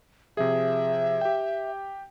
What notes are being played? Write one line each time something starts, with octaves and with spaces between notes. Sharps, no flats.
C3 F3 G#4 E5
G4 G5